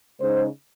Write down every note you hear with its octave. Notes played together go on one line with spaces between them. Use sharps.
C#3 G#3 D#4 C5